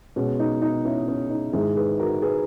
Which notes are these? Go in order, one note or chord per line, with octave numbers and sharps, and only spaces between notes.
B2 G#3 B3 C#4
D#4
D#4
C#4 E4
C#4
D#4
G#2 D#3 G#3 E4 G#4
G#4 B4
F#4 A#4
G#4 B4